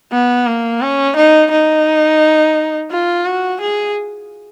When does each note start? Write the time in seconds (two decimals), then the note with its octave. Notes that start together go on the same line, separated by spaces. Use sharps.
0.12 B3
0.46 A#3
0.81 C#4
1.16 D#4
1.51 D#4
2.91 F4
3.25 F#4
3.61 G#4